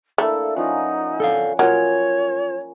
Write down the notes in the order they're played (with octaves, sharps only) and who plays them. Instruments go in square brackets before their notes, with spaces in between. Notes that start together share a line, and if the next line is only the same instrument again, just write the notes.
[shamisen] A3 [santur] A#3 D4 E4 [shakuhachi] A4
[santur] F3 C#4 F#5 [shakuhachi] D#4
[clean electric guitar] A4 D5 F5
[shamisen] F#3 [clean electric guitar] F4 A#4 [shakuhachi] C#5 [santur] G#5